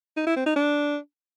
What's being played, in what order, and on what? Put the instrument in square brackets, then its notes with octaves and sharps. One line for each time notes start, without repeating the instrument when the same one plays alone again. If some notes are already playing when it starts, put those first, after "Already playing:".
[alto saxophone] D#4
E4
C4
D#4
D4